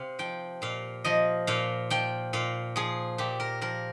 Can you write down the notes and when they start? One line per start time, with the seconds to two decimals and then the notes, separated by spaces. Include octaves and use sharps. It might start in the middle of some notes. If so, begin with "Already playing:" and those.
Already playing: C3 F5
0.19 F3 G5
0.62 A#2 F5
1.04 F3 D#5
1.47 A#2 F5
1.90 F3 G5
2.33 A#2 F5
2.76 F3 G#4
3.18 A#2 G4
3.40 A#4
3.62 F3 A#4